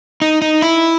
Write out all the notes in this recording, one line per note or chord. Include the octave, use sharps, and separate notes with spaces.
D#4
D#4
E4